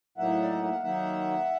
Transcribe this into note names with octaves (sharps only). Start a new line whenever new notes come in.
A2 F#3 A#3 D#4 E5 F#5
D5
D#5
E5
F5
D#3 F#3 A#3 D#4 E5 F#5